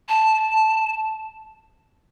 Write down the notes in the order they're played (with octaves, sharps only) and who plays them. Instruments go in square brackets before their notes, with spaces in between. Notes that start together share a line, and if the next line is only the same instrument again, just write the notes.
[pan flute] A5